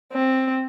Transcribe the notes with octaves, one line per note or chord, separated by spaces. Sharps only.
C4